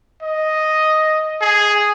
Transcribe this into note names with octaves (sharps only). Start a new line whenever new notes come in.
D#5
G#4